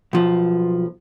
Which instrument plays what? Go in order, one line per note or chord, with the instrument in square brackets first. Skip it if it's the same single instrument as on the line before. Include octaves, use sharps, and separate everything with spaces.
[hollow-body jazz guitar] B1 F3